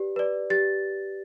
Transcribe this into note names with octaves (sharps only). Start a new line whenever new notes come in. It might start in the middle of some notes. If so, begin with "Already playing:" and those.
Already playing: G4 B4 D5
B4 D5
G4 A6